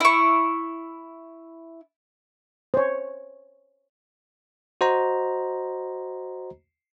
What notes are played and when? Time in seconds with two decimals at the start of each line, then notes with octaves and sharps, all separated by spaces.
0.01 E4 C#6
2.74 C5 C#5
4.81 F#4 C5 D#5 A#5